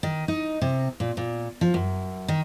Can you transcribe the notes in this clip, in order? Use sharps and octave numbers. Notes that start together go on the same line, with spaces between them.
D#3
D#4
C3
A#2
A#2
F3
F#2
D#3